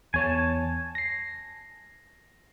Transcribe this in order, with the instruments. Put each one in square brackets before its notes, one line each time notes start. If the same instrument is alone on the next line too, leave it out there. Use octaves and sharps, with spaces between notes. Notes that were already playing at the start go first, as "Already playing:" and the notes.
[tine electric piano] E2 C#5 [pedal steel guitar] G#5 A5
[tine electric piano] A#6 C7